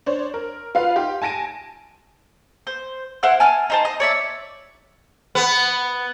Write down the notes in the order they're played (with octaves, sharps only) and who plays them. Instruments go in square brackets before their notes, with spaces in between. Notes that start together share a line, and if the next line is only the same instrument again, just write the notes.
[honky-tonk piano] D4 C5 C#5
A#4
F4 B4 F5
D#4 G4 C6
G#5 A5 A#6 D7 D#7
[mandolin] C5
E4 C5 F#5 F6
G#5 A5 F6
D#4 C5 A5
D#5
C#5 D5 E5
[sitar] B3